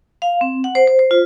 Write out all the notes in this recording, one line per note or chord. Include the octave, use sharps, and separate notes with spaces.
F5
C4
F#5
C5
C5
C5
F4